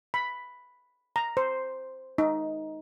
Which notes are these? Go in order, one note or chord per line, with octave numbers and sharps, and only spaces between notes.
B5
A#5
C5
D#4